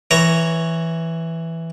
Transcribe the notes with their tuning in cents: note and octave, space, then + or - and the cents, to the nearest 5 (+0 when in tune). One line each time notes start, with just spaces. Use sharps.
E3 +0 C#5 +0 A#5 -10